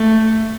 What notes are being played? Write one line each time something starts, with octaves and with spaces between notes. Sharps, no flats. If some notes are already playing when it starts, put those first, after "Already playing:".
Already playing: A3